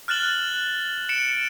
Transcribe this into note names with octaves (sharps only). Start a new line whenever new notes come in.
F6 F#6 A6 E7 F#7 G7
C#7 D7 E7